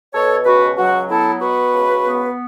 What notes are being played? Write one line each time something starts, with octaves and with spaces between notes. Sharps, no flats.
B2 A4 C#5
C#2 F#4 B4
F#3 F#4
B3 E4 A4
B2 F#4 B4
C#2
B3